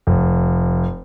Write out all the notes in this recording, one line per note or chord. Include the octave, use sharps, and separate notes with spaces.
F1